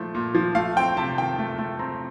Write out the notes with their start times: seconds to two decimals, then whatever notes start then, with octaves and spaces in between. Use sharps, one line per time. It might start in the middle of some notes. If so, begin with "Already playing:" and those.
Already playing: A#2 F3 A3 C4
0.15 A#2
0.35 F3
0.55 A3 F5
0.77 C4 G5
0.97 C3 A5
1.18 D#3 G5
1.39 A3
1.58 A3
1.79 C4 A#5